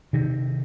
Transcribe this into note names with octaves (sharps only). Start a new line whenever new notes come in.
C3 D#3